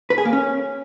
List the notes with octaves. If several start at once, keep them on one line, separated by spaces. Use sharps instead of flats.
B4
G#4
A#3
C#4